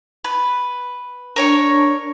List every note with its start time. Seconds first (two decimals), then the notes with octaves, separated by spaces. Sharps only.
0.24 B4
1.36 D4 A#4 C#5 C#6